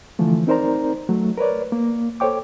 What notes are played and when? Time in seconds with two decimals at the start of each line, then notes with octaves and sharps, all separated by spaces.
0.19 D3 E3 F3 A3
0.47 C4 D#4 A#4 C5 D5 A#5
1.09 F#3 A3
1.38 A#4 B4 C#5 D5
1.72 A#3
2.20 A4 C5 C#5 G5 D6